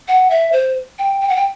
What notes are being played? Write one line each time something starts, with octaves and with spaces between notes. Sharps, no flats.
F#5
E5
C5
G5
G5
F#5
G5